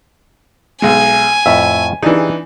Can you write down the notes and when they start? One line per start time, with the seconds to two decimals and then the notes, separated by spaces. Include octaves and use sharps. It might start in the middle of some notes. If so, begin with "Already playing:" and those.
0.82 B1 G#3 G#5
1.46 F2 A2 F4 E5
2.02 E3 D4 D#4 G4 G#4 D5